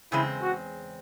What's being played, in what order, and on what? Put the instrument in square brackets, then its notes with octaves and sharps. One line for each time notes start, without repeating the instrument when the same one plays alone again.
[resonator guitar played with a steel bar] E2 C#3 G#3 C4 [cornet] E4
[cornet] F#4